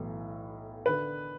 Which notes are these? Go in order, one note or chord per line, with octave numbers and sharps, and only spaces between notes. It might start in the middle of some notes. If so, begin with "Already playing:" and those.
Already playing: B1 A2 E3
D3 B4